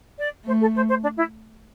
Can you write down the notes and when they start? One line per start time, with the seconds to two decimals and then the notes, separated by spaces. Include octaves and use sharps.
0.18 D5
0.46 A3 C5
0.60 A4
0.74 C5
0.88 C5
1.02 D4
1.16 E4